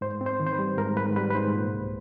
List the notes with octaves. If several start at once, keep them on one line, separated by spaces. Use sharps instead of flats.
G#2 C5
C4
C5
D#3
C5
B4
G3
G#2 A#4
G#2 B4
G3 B4
B4
G#2 C5
A#2
C2